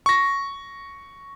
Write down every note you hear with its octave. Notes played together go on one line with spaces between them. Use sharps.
C#6 A#6